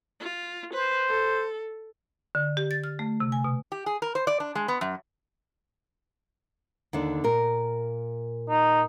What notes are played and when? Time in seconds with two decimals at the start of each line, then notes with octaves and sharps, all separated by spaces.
0.20 F4
0.74 B4 C5
1.08 A4
2.35 D3
2.57 G4
2.71 A6
2.84 F6
2.99 A3
3.20 C3
3.32 G#5
3.44 B2
3.72 G4
3.86 G#4
4.02 A#4
4.15 C5
4.27 D5
4.40 D4
4.55 G#3
4.68 B3
4.81 F#2
6.93 D#2 D3 D4
7.24 A#2 A#4
8.50 D#4